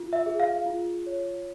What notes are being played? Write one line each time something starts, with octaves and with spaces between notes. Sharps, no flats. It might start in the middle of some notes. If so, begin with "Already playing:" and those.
Already playing: F4
E5
G#4
F5
F4
C#5